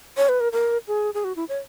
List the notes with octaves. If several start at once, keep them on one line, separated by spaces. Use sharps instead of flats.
C#5
B4
A#4
A#4
G#4
G#4
F#4
E4
C#5